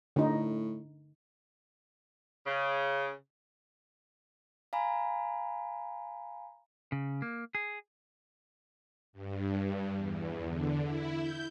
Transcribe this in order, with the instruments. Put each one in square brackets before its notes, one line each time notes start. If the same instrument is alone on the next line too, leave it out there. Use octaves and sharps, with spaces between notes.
[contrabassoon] A2 [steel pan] D3 D#4
[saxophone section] C#3
[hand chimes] F5 G#5 A#5 B5
[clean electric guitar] C#3
A#3
G#4
[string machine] G2
E2
D3
E4
G6